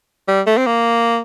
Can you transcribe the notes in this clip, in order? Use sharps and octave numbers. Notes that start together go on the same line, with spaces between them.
G3
A3
C4
A#3